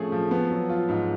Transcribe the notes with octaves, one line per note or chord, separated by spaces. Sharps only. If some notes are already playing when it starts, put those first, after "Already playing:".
Already playing: F3 A3 C#4 G#4
F3
B3
F#3
F4
G#2